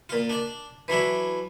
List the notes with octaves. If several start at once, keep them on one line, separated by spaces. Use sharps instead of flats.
A#2 F4
D4 D5
E3 F#3 D4 E4